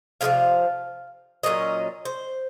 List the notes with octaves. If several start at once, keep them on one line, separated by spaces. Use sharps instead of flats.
C3 F3 G#3 C#4 F5
A#2 F#3 C#4 D#5
C5